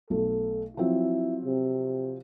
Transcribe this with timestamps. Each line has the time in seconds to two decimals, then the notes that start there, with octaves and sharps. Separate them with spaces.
0.10 B1 A3 A4
0.77 F3 F#3 C4 E4
1.45 C3